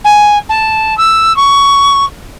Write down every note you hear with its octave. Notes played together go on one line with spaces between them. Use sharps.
G#5
A5
E6
C#6